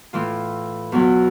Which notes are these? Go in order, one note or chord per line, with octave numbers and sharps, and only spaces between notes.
A2 E3 F4
E2 B2 F#3 F#4